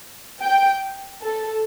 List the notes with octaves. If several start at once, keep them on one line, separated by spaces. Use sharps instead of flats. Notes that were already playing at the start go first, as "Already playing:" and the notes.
G5
A4